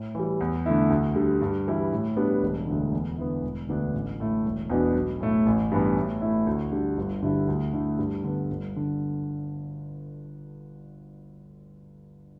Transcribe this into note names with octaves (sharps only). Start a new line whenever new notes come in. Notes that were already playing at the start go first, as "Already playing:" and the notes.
Already playing: A2
E3 G3
E2
D3 A3 E4
D2
D3 G3
G2
E3 G3 E4
A2
G3 B3 D4
E1
D2 D3
E2
D3 B3 E4
E1
D2 D3 B3 D4
A1
A2 A3 E4
E1
E2 B2 B3 D4
B1
A2 A3 E4
A1
G2 E3 B3
A2
A3 E4
D2
D3 G3
G1
G2 D3 G3 E4
D2
D3 A3 E4
G2
D3 B3
G1
D3